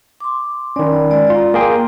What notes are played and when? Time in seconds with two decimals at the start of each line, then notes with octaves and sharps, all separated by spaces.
0.20 C6 D6
0.76 D#3 C#4 D5 B5
1.10 G#3 D5
1.30 F4 F5 A#5
1.54 A#3 G#4 G5 A#5 C6